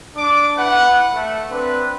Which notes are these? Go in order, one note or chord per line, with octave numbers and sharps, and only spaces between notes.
D4 D6
E4 B4 F#5
A3
C4 D4 B4